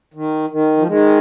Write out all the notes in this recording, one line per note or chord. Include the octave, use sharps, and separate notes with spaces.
D#3
D#3
F3
D#3 G#3